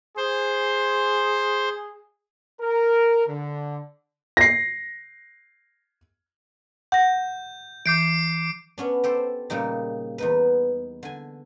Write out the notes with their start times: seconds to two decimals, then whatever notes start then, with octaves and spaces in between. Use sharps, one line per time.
0.17 G#4 C5
2.61 A#4
3.28 D3
4.37 A#6 C7
6.92 F#5 G6 A#6
7.86 E3 D6 G6 C7 D7
8.78 B3 C#4 D4
9.04 G4 A4 C5
9.50 A#2 C#3 G3 D#4
10.18 E2 D#4 B4
11.03 D3 G#5